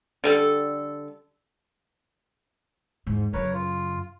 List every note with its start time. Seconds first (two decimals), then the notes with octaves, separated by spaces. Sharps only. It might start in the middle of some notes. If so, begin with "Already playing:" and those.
0.24 D3 G3 A4
3.07 E2 G#2
3.33 F#2 C#3 A#4 B4 C#5
3.54 F4